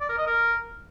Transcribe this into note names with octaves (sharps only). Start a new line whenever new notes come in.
D5
A#4
D#5
A#4